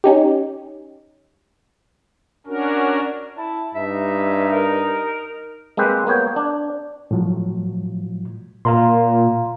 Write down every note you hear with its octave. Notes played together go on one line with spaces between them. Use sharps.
C#4 D#4 G4
C#4 D4 F#4 A#4
E4 A5
G2 D#4 E5
A#4
G#3 A#3 C4 G4 B4
A#3 B3 C#5 G5
D4
A2 F3 F#3
A#2 F5 A#5 C6